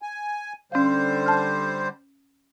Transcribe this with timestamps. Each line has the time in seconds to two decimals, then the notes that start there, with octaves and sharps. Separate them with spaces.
0.02 G#5
0.72 D3 G3 C#4 C5 F5
1.26 A5 F6